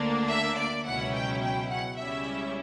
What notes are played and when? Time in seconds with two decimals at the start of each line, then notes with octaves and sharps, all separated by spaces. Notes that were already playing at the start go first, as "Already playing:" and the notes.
Already playing: D2 D3 A#3 D4
0.30 E5
0.58 D5
0.86 C#2 B2 F#3 C#4 E4 F#5
1.15 G5
1.43 G5
1.71 F#5
1.98 C#2 C#3 G3 C#4 E4 E5